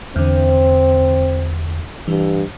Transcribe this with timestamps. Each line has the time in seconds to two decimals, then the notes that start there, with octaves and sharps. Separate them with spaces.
0.16 E2 D3 C4
2.08 G2 E3